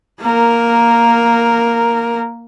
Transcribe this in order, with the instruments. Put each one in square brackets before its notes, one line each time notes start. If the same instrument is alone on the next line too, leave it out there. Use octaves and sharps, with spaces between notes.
[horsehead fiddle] A#3 A#4